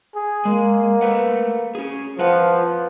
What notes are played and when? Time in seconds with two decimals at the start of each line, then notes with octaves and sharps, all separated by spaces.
0.15 G#4
0.45 G#3 A#3
1.01 A3 B4 F#5
1.75 C#4 G#4
2.19 F2 F3 B4 F#5